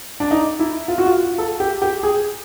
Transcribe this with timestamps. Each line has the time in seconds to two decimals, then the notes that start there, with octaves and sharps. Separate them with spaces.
0.20 D4
0.31 D#4
0.60 E4
0.88 F4
0.98 F#4
1.06 F4
1.38 A4
1.60 G4
1.82 G4
2.03 G#4